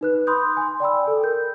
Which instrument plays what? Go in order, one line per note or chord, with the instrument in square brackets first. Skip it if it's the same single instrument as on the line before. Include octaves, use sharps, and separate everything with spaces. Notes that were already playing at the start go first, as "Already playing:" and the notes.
[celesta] D#4 B4 F#6
B5 C6 D#6 G6
G#5 C6
D5 G5 B5 E6
A4
A#4 G6